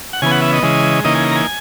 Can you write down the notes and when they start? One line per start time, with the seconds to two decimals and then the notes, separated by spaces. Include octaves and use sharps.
0.13 F#5
0.22 C#3 E3 B3 G#5
0.31 F#5
0.42 E5
0.53 D#5
0.63 C#3 E3 G#3
1.04 C#3 E3 A#3 D#4 D#5
1.15 G#5
1.31 A#5
1.36 G#5